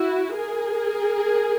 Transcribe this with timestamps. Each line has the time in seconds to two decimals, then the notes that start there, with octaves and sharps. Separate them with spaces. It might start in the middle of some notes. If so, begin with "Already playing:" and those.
Already playing: E4 F#4
0.34 G#4 A#4